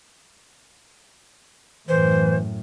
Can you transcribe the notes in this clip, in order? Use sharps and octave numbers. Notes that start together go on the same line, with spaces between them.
F#2 A2 E3 C5